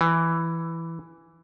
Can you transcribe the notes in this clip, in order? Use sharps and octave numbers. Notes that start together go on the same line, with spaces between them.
E3